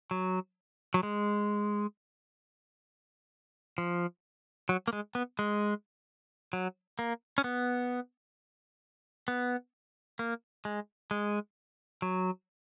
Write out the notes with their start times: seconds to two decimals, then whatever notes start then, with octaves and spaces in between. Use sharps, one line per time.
0.11 F#3
0.94 F#3
1.03 G#3
3.78 F3
4.69 F#3
4.88 A#3
4.93 G#3
5.15 B3
5.39 G#3
6.53 F#3
6.99 A#3
7.38 C#4
7.44 B3
9.28 B3
10.19 A#3
10.65 G#3
11.11 G#3
12.02 F#3